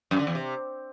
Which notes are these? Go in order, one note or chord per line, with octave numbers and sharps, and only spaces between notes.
F#2
D3
E2
C3